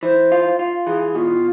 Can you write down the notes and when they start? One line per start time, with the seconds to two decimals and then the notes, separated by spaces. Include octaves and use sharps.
0.03 E3 C5
0.32 F4
0.59 F4
0.87 E3 G#4
1.15 B2 F4